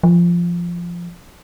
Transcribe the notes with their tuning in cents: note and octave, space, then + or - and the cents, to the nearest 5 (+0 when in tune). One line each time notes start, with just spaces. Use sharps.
F3 -10